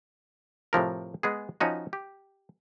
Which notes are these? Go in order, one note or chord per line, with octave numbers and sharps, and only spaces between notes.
A2 C3 F3 A#4
G#3 B3 G#4
F3 C#4 D#4 F#4
G4